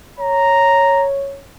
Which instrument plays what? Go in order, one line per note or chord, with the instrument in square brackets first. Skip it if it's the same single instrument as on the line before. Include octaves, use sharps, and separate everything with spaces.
[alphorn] C#5 [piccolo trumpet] A#5